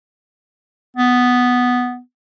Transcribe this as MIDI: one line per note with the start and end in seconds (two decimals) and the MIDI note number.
0.97 1.99 59